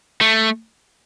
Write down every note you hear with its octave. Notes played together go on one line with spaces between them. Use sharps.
A3